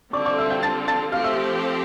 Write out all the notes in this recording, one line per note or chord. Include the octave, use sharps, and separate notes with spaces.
D3 G3 C4 F4 D5 D6
D5 D6
E5 E6
G5 G6
A5 A6
A5 A6
F3 A3 C4 G4 F5 F6
E5 E6